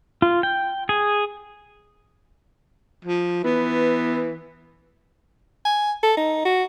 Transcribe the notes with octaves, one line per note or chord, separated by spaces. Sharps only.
F4
G5
G#4
F3
E3 B3
G#5
A4
D#4
F#4